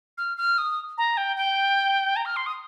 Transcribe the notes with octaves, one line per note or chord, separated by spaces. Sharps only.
F6
F6
D#6
A#5
G5
G5
A#5
F6
C6
D#6